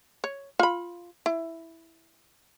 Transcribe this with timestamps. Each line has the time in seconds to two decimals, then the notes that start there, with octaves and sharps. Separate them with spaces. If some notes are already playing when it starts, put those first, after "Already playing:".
0.24 C#5
0.59 F4 B5
1.26 E4